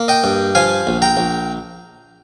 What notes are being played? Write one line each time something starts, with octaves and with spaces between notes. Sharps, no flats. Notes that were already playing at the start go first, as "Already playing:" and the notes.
Already playing: A#3
D#5 G5
G2
F3 F5 G#5
A#1
G5 A#5
A#1